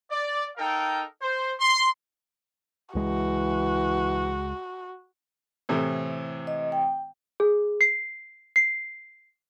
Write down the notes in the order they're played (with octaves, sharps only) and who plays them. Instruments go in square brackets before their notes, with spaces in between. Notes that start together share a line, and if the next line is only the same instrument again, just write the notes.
[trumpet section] D5
D#4 A4 A#4 F5 G5
C5
C6
[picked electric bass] C#2 G#3 [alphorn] E3 [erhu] F#4
[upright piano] A2 C3 E3
[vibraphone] D#5
G5
[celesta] G#4
C7
C7